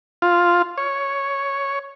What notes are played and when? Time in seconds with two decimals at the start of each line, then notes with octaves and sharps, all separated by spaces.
0.22 F4
0.78 C#5